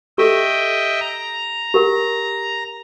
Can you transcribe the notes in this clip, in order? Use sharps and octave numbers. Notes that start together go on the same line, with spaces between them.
G4 A4 D#5 E5 G5
A#5
G4 A#4 F#5